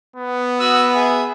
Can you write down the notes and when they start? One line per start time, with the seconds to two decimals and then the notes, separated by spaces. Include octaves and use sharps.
0.16 B3
0.60 F#4 D#6 E6
0.95 G#4 E5